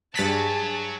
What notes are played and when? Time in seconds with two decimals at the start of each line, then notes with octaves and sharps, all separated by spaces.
0.15 G2 F#3 G#4 A5 A6 B6